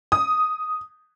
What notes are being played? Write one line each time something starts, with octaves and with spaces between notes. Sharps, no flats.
D#6